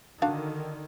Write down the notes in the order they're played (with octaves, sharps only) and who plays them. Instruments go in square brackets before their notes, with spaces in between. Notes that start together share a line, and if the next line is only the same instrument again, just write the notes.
[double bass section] D3 D#3 [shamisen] D4 F#4 F5